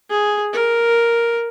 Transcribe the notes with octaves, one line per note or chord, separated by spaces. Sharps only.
G#4
A#4